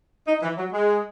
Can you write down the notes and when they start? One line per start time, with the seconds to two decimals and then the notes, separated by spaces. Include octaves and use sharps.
0.28 D#4
0.42 E3
0.57 F#3
0.72 G#3